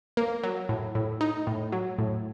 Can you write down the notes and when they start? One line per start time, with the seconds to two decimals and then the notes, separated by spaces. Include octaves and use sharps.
0.17 A#3
0.44 F#3
0.69 A2
0.95 A2
1.21 D#4
1.47 A2
1.72 F#3
1.99 A2